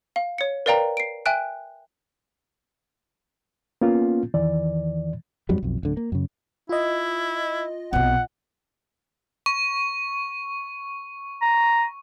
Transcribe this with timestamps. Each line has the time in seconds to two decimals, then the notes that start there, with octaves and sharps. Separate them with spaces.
0.16 F5
0.38 C#5 C#7
0.66 A#4 B4 D5 F5 G5 A#5
0.97 C7 D7
1.26 E5 G5 G#5 F#6 D7
3.81 A#3 B3 C#4 F4
4.34 E2 D#3 E3 D5
5.49 F2 G#2 F#3 G3
5.63 B1 F2
5.83 D1 D3
5.97 A#3
6.12 F#2 C#3
6.69 E4 F4 D#5
7.93 B1 C3 F#5
9.46 C#6
11.42 A#5